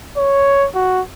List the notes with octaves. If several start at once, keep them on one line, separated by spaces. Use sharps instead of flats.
C#5
F#4